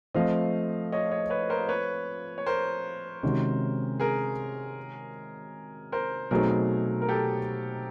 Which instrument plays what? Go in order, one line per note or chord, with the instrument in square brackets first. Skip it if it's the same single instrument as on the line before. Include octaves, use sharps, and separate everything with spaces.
[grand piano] F3 A3 C4 [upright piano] D#5 F5
[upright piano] C#5 D#5
C#5 D#5
B4 C#5
A#4 C5
B4 C#5
C#5
A#4 C5
[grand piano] C3 D#3 G#3 C#4 F#4
[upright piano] G#4 A#4
A#4 C5
[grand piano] B2 F#3 A3 C4 D#4 [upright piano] G#4 A#4
[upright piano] A#4
G4 A4